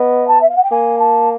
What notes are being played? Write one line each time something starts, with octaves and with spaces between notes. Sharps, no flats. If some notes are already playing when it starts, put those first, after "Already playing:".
Already playing: B3 D#5
A5
E5
F5
F#5
G5
A#3 G#5
A5